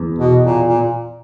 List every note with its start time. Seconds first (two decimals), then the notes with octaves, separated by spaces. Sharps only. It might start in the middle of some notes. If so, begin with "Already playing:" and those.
Already playing: E2
0.19 B2
0.44 A#2
0.68 A#2